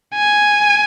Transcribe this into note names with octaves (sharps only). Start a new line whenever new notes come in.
G#5